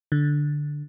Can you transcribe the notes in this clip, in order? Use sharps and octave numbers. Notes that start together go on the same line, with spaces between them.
D3